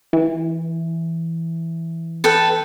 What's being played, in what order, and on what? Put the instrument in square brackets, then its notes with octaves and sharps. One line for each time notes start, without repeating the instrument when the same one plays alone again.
[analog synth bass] E3
[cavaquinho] A4 B4 G5